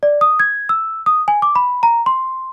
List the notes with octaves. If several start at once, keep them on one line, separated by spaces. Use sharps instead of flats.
D5
D#6
G#6
E6
D#6
G#5
D6
B5
A#5
C6